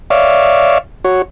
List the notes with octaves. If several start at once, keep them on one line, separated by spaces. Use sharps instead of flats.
C#5 D5 E5 F5
F#4 C#5